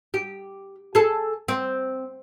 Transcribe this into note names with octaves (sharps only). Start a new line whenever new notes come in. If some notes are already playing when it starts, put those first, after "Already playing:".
G4
G#4 A4
C4